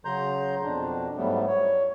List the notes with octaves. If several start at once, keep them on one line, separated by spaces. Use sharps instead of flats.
C#3 F#3 A#5 C6 G6
F2 B2 D4
G#2 F#3 G3 A3 B3
C#5